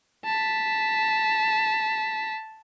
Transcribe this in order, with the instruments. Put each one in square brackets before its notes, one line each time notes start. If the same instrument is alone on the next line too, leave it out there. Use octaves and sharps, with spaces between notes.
[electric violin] A5 B6